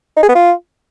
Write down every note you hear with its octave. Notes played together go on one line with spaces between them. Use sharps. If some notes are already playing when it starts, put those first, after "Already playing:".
D#4
G#4
B3
F4